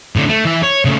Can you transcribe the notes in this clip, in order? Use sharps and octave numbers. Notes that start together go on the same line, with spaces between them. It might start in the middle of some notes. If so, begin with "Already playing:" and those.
A2 D3
A3
E3 E5
C#5
C#3 A3